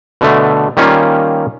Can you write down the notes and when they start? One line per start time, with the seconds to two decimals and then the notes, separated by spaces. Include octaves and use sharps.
0.21 B2 D3 A3
0.77 D#3 G3 A#3 C#4 F4